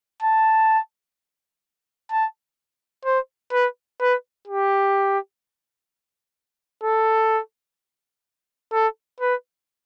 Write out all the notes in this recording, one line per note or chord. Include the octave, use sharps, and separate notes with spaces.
A5
A5
C5
B4
B4
G4
A4
A4
B4